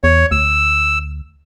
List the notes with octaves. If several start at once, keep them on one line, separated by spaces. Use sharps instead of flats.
E2 C#5
D2 E6